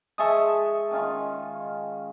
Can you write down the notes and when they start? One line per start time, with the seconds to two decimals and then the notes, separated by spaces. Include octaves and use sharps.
0.18 G#3 E5 G#5 A5 C#6 D#6
0.91 D#3 C#4 F4